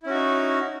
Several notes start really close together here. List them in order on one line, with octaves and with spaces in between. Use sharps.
E4 C#4 F#4 D#4